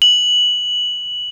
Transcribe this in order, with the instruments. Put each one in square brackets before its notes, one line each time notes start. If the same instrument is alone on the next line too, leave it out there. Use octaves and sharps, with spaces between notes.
[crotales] F#7